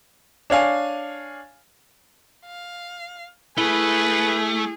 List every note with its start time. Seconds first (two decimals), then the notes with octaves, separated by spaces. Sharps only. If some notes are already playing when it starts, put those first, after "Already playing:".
0.50 D4 C#5 F5 G#5
2.46 F5
3.58 A3 E4 G#4 B4